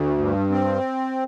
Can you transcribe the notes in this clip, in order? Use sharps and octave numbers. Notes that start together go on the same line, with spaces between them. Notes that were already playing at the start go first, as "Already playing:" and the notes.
Already playing: D2
G2
C4